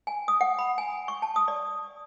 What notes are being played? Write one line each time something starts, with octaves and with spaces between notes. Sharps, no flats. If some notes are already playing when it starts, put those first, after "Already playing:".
G#5
D#6
F#5
B5
G#5
C#6
A5
D#6
D5